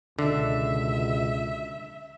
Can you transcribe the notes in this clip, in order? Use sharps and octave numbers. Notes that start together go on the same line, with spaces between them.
C#2 B2 D3 E5